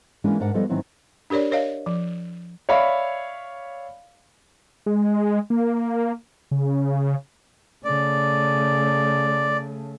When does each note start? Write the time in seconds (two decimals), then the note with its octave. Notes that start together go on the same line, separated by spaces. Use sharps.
0.24 E3 G#3 A#3 C#4 D4 E4
0.40 G#2 D4 A#4 F#5
0.54 F3 G3 B3 E4 A4 D#5
0.69 G#2 D#3 E3 F#3 C4 E4
1.30 D4 G4 A#4 C#5 D5
1.51 A#4 C#5 D#5 F5
1.86 F3
2.69 C#5 D5 E5 F5 B5
4.86 G#3
5.50 A#3
6.51 C#3
7.85 C#3 A3 D5